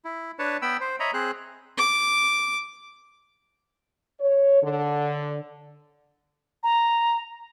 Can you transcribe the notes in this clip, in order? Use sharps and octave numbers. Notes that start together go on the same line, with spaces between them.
E4
D4 B4 C#5 A5
B3 G5 B5 E6
C5
C#5 D#5 E5 A#5 B5
C4 G#4 C5 F#6
D6
C#5
D3
A#5